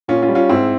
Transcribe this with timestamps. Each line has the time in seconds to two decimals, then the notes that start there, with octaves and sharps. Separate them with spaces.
0.08 A#2 C#4 F4
0.22 C#4 F4
0.28 G3
0.35 C#4 F4
0.49 G#2 C4 E4